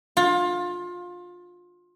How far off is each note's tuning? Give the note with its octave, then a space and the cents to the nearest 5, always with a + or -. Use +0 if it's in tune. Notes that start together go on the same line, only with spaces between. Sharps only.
F4 +25